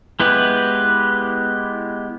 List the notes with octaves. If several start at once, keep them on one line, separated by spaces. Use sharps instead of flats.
G#3 B3 E4 G4 B4